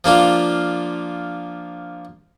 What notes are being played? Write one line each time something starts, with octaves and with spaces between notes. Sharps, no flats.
F3 A#3 D4 F4